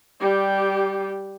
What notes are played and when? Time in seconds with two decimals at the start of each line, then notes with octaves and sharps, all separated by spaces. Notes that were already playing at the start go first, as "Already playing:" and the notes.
0.20 G3 G4